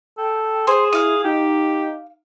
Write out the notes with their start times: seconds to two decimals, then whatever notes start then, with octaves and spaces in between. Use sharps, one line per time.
0.18 A4 G5
0.67 G#4 C5
0.93 E4 F5 D#6
1.24 D#4 G4